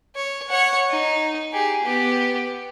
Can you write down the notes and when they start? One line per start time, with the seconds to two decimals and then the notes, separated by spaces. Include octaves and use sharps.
0.15 C#5
0.49 C#5 F#5
0.90 D#4
1.53 G4 G#4
1.83 B3 G4